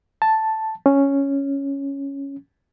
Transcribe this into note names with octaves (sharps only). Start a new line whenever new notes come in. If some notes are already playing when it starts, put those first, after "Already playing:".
A5
C#4